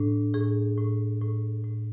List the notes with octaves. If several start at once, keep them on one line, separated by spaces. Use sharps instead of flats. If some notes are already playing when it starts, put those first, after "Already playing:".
Already playing: A2 D4
A2 G#4
A2
A2
A2